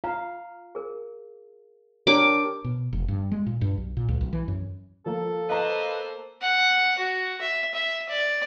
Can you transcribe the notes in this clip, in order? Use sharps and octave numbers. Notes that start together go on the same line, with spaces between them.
F4 F5 A#5
G#4 A#4
D4 G4 A#4 C#5 D5 A#5 D6
B2
F1
G2
G#3
A#2
G2
B1
A#2
C#2
B1
E3
F#2
F3 A#3 A4
A#3 B4 C5 D#5 F5 A#5
F#5
F#4
E5
E5
D5